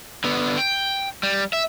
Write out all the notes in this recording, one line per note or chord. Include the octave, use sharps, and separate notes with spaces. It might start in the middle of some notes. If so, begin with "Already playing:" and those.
D3 B3
G5
G3
E5